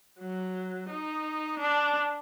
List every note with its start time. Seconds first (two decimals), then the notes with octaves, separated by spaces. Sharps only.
0.20 F#3
0.90 D#4
1.59 D4